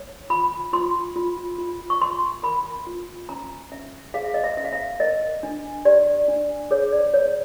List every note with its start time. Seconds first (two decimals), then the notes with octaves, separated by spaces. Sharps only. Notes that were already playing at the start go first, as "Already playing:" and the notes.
Already playing: C#5
0.30 F4 B5
0.73 F4 C6
1.16 F4
1.58 F4
1.90 C#6
2.01 F4 C6
2.43 A#4 B5
2.87 F4
3.29 C#4 A#5
3.72 C#4 E5
4.14 G#4 F5
4.24 E5
4.34 D#5
4.44 E5
4.57 C#4 E5
4.64 F5
4.73 E5
5.00 A#4 D#5
5.43 D4
5.85 G4 D5
6.28 D4
6.71 G#4 C#5
6.92 D5
7.14 C#5